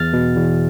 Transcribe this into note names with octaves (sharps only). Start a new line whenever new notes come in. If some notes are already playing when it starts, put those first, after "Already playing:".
Already playing: E2 F6 A6
B2
E2